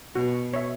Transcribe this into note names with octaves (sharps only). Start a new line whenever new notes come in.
B2 F#4
C#5 E5